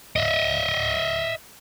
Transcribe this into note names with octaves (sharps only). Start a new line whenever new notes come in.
D#5 E5